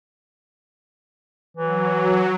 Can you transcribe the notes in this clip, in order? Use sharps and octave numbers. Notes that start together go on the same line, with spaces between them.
E3 F#3